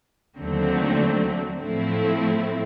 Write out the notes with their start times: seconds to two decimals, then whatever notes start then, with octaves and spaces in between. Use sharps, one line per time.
0.37 D#2 D3 F#3 A3 C4
1.59 A2 F3 A3 C4 E4